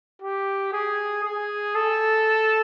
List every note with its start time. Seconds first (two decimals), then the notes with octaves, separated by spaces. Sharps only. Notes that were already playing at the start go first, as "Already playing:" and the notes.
0.22 G4
0.73 G#4
1.24 G#4
1.75 A4